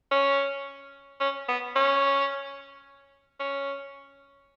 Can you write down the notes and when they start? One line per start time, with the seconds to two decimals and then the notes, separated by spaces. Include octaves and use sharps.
0.11 C#4
1.20 C#4
1.48 B3
1.76 C#4
3.40 C#4